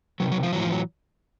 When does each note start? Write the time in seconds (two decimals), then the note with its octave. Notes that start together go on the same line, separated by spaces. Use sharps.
0.20 C3 D#3 F#3
0.32 F#3
0.43 F3
0.53 A2 E3 F#3
0.62 F3
0.71 F#3